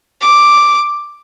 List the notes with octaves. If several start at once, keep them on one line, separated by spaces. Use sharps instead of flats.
D6